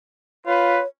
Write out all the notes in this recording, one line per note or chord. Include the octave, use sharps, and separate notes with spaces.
F4 B4 C#5